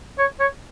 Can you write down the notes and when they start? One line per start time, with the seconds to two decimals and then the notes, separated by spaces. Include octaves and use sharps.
0.18 C#5
0.40 C#5